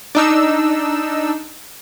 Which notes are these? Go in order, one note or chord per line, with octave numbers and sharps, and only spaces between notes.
D4 D#4 E6